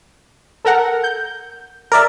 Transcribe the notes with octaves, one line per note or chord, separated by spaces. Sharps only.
A4 A#4 F#5
G6
A#4 D5 E5